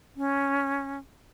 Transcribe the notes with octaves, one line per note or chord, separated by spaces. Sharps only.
C#4